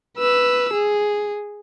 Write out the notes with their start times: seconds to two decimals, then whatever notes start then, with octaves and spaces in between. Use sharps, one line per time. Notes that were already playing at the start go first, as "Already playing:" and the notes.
0.18 B4 E6
0.73 G#4